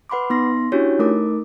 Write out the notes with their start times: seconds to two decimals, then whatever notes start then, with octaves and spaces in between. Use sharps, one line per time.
0.10 B4 F#5 B5 C6 D6
0.30 B3 D#4 C6 A#6
0.72 C#4 D4 E4 F#4 G4 C#5
0.99 A3 D#4 A#4 D6